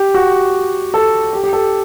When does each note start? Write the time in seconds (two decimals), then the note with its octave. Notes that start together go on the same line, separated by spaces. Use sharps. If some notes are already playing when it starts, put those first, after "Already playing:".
Already playing: G4
0.14 F#4
0.94 A4
1.33 G4
1.44 G4
1.53 A4